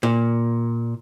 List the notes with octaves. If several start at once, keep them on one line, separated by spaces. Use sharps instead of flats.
A#2